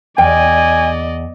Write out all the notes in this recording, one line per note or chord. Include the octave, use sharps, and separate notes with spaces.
E2 D5 D#5 G5 G#5